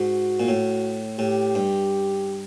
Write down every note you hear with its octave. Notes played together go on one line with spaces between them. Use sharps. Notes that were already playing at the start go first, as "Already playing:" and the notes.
Already playing: G#2 F#4
A#2
A2
A2 G4
G2